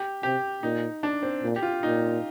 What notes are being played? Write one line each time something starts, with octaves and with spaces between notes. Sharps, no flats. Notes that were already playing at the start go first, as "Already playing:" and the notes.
Already playing: G4
C3 G4
A#2 D#4
D4
C4
A#2
G4
F4
A#2 D#4